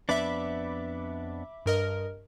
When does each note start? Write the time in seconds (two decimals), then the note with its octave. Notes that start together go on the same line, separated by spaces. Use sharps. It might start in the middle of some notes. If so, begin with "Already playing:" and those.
0.09 F2 B3 D4 E5 B5 D6
1.66 G2 A#4 D#5